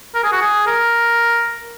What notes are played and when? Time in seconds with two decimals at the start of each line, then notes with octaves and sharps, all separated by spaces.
0.15 A#4
0.24 G#4
0.32 F#4
0.42 G#4
0.67 A#4